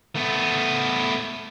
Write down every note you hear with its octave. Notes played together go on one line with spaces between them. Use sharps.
A3 B3